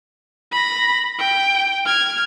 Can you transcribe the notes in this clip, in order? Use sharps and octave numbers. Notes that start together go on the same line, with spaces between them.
B5 A#6
G5
F6 G#6